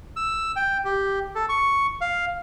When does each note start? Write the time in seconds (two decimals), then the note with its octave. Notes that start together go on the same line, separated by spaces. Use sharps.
0.16 E6
0.56 G5
0.85 G4
1.35 A4
1.49 C#6
2.01 F5